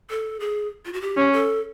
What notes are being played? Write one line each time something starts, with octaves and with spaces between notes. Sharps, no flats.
A4
G#4
F4
F#4
G4
C#4
A4